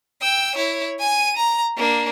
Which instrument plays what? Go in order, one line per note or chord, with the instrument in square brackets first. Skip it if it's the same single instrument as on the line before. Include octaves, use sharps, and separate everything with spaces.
[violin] G5 E6
E4 C#5
G#5 D#7
A#5
A#3 D4